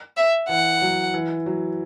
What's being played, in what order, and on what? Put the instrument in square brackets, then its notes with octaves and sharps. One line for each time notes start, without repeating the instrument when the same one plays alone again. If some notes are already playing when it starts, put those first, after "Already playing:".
[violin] E5
[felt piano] E3 [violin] F#5
[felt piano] F#3
E3
F#3